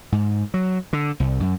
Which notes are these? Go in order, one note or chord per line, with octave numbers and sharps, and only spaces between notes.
G#2
F#3
D3
C2
F#2